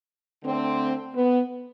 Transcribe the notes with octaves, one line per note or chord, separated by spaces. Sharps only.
D3 A3 C4
B3